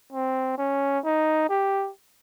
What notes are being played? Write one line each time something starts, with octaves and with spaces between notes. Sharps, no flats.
C4
C#4
D#4
G4